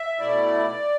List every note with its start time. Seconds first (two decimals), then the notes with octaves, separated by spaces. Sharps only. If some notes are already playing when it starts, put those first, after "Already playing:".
Already playing: E5
0.19 B2 A3 E4 D5